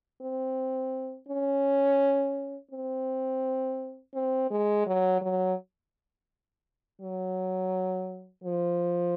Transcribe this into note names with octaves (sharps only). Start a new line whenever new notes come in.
C4
C#4
C4
C4
G#3
F#3
F#3
F#3
F3